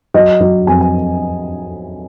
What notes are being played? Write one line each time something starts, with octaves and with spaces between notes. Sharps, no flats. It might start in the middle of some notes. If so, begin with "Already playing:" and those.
F#3 D#5
F#3
F2 G#5
G#5